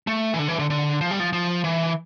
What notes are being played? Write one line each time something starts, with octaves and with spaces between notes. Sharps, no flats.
A3
E3
D3
E3
D3
D3
F3
G3
F3
F3
E3